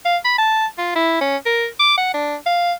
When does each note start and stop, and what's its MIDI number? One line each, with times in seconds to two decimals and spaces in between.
0.05 0.17 77
0.25 0.36 83
0.38 0.66 81
0.78 0.93 65
0.96 1.16 64
1.21 1.36 61
1.46 1.67 70
1.80 1.96 86
1.97 2.14 78
2.14 2.36 62
2.46 2.73 77